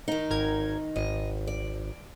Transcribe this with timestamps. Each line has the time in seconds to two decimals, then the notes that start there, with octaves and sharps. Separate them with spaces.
0.08 D#3 D#4
0.30 G#1 A#4 G#6
0.96 G#1 D#5
1.47 D5